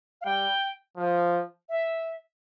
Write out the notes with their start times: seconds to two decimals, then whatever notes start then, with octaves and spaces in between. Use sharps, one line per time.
0.21 F5
0.25 G3 G5
0.97 F3
1.69 E5